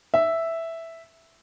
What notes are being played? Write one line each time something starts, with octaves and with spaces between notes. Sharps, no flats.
E5